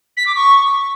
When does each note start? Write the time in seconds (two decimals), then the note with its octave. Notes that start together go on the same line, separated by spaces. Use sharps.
0.16 B6
0.26 D6
0.35 C#6